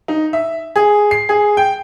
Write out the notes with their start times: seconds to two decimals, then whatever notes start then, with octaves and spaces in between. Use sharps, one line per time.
0.08 D#4
0.33 E5
0.76 G#4
1.11 C7
1.29 G#4
1.57 G5